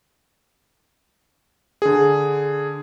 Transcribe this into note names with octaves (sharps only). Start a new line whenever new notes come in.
D3 G#4